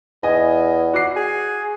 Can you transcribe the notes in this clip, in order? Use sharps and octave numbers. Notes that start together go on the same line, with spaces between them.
E2 D#5 G#5
F#4 D6 C7
G#4